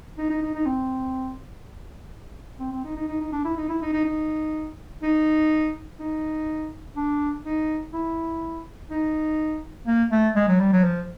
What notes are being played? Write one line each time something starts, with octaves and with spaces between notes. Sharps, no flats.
D#4
D#4
D#4
D#4
C4
C4
C4
D#4
D#4
D#4
D#4
D4
E4
D#4
E4
D#4
D#4
D#4
D#4
D#4
D4
D#4
E4
D#4
A#3
A3
G#3
F#3
G3
F#3
F3